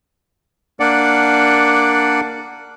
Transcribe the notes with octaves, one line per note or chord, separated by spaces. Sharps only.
A#3 D4 D5 F#5